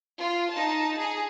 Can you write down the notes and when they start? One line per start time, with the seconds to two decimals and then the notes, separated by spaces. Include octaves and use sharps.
0.20 F4
0.51 D#4 A5
0.98 G#4